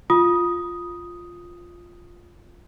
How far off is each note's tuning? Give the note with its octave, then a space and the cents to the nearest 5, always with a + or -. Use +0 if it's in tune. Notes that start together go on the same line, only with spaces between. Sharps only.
F4 +0 D#6 +0